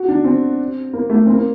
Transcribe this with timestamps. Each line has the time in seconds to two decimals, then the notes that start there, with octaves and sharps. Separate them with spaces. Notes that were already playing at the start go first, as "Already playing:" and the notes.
Already playing: F#4
0.08 D4
0.24 C4
0.93 A#3
1.10 A3
1.26 C4
1.34 A#3